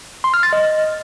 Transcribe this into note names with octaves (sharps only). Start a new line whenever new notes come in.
C6
F6
A6
D#5